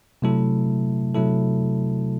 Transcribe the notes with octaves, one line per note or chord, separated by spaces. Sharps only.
C3 F#3 A3 E4 A4
C3 F#3 A3 E4 A4